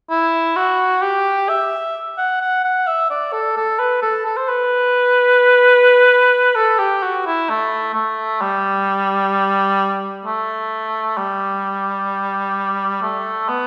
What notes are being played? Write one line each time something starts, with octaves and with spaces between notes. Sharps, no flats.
E4
F#4
G4
E5
F#5
F#5
F#5
E5
D5
A4
A4
B4
A4
A4
C5
B4
A4
G4
F#4
E4
A3
A3
G3
A3
G3
A3
B3